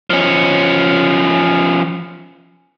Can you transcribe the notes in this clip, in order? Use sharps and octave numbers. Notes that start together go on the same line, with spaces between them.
F3 C#4